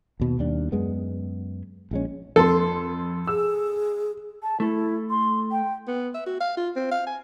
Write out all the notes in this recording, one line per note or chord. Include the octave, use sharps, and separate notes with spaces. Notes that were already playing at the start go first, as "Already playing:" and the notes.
D#2 B2
D#2 G3 D4
F#2 G#3 B3
A#1 G#3 C#4
F2 A4 C6
G#4 E6
A5
A3 E4 A4
C6
G5
B3
E5
F#4
F5
F4
C4
F5
G#5